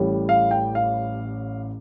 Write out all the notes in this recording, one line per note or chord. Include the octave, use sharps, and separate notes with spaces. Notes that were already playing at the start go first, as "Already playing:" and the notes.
Already playing: A1 A2 G3
F5
G5
F5